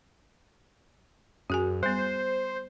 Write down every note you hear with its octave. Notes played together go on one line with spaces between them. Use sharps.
F#2 F#4 G#4 G#5
G3 B3 C5